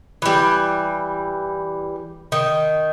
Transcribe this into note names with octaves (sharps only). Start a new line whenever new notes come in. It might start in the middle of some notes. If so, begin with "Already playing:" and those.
E3 G3
D#3